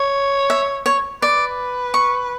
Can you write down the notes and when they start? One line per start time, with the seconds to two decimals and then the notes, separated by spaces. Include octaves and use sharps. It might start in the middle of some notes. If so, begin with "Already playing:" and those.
Already playing: C#5
0.50 E5
0.86 C#5
1.22 B4 D5
1.94 C#6